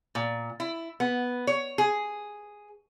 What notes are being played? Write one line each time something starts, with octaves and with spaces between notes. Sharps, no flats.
A#2
E4
B3
C#5
G#4